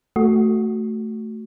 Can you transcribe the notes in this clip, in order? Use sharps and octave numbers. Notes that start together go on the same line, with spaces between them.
A3 F#4